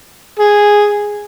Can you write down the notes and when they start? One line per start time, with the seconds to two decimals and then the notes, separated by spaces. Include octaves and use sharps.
0.39 G#4